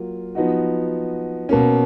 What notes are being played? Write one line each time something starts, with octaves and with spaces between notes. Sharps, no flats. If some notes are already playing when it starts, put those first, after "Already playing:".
Already playing: F#3 A#3 F4
F3 B3 D#4 F#4
B2 A#3 C#4